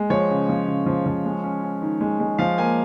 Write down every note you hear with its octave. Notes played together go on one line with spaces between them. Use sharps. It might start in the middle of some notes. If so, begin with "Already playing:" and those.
Already playing: G#3
F3 C#5
C#3
F3
C#3
F3
F3
G#3
C#4
C#4
D#3
G#3
G#3
F3 F5
A#3 G#5